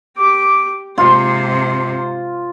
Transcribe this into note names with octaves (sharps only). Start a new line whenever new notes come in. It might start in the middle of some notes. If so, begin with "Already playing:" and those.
G4 D6
G#2 C3 F4 C5